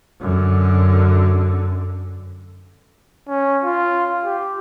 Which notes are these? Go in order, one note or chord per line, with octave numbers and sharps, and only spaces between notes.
F#2 D3
C#4
F4
G4